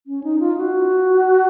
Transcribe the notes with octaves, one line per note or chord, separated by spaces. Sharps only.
C#4
D#4
F4
F#4